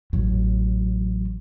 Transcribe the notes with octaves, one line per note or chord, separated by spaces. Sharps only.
A1 F#3